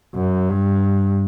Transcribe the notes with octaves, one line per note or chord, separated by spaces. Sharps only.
F#2
G2